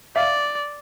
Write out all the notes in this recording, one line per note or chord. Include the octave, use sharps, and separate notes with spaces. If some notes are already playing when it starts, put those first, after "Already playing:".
D5 E5 F5